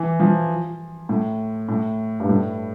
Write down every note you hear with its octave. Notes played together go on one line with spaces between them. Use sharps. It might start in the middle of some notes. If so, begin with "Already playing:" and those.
Already playing: E3
F3
A2
A2
G2
A2